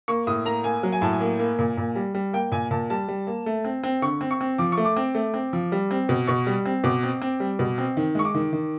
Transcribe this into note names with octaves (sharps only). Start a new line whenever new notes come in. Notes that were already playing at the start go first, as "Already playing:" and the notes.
A#3 C#6
A2 D#6
A#3 A#5
A#3 G#5
F#3
G#5
A2 A5
G#5
A#3
A#3
A#2
A#2
G3
G3
A#3 G5
A#2 G#5
A#2 A5
G3 A5
G3
A#3
A3
C4
C4
D3 C#6
C4
C#6
C4
F3 D6
C#6
A3
D6
C4
A3
C4
F3
G3
C4
B2
B2 C#6
G3
C4
B2 D6
C4
C4
G3
B2
C4
D#3
G#3 C#6
D6
D#3
D#3